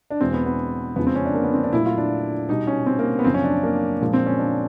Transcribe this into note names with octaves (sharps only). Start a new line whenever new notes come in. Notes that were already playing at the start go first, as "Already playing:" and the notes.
D4
E2 B2 G#3 C4
B3
B3
F2 C#3 F3 G#3 B3
C4
C#4
D4
A#3
B3
C4
D4
A#2 F#3 A3 E4
F4
D4
B2 G3 D#4
C#4
C4
A#3
B3
F#2 C#3 F3 C4
C#4
D4
A#3
A#2 F3 G#3
C4
C#4
D4